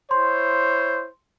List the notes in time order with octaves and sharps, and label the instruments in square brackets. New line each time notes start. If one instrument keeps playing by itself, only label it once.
[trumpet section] E4 C5 C#5 [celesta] C6